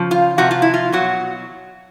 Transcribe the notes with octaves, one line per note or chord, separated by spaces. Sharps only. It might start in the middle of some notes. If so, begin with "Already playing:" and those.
Already playing: C#3 F3
F4
C3 F3 F#4
F4
E4
F4
B2 F#3 F#4